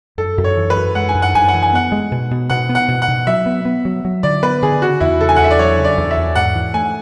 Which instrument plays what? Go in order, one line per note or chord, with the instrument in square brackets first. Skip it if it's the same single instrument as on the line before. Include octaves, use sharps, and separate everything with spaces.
[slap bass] F#2 [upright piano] A4
[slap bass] F#2
[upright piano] C#5
[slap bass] E3
[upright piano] B4
[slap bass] F#2
[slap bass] G#3 [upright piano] F#5
[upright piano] G#5
[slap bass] F#2
[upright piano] F#5
[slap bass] F#2 [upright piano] G#5
[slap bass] E3 [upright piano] F#5
[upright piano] G#5
[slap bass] B3 [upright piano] F#5
[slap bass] G#3
B2
B2
[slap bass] B2 [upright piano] F#5
[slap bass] B3
[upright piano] F#5
[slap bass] B2
[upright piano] F#5
[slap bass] B2
[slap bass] F#3 [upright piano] E5
[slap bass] B3
B3
F#3
F#3
[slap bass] D3 [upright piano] D5
[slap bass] B3 [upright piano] B4
[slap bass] D3 [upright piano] G#4
[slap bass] C#3 [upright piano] F#4
[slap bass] E2 [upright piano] E4
[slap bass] C#3 [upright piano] A4
[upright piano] G#5
F#5
[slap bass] E2 [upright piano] E5
[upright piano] D5
[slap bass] F#3 [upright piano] C#5
[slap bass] C#3
[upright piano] D5
[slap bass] E2
[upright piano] E5
[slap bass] E2
[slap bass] G#2 [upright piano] F#5
[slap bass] E3
[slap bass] A3 [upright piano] G#5